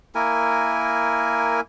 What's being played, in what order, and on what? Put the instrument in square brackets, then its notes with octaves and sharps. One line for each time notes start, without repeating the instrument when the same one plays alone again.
[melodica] A#3 E4 A#4 G#5